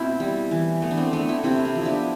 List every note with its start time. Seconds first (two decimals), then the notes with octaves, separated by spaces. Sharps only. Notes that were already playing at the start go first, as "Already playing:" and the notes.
Already playing: B2 A3 C4 E4
0.20 G3
0.51 E3
0.82 A3 B3
0.91 D4
0.98 C4
1.13 A3 B3 D4
1.29 C4 E4
1.44 C3 C4 E4
1.65 C4
1.75 F3
1.82 B3 D4 E4